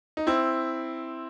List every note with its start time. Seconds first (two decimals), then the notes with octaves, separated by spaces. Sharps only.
0.17 D#4
0.27 C4 E4